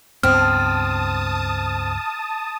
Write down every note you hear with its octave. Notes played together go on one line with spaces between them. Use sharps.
C#2 G2 B3 C4 A5 D#6 F6